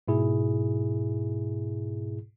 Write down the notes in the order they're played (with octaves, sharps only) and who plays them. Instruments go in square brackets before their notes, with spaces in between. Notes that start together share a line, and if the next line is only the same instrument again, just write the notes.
[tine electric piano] G#2 B2 E4 G#4